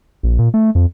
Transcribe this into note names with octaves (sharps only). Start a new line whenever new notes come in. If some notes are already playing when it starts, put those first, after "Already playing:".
A#1
A#2
A3
F2